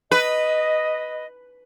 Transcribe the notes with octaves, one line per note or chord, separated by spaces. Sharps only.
B4 D#5